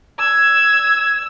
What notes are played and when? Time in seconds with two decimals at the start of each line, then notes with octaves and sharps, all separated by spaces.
0.19 E6 G#6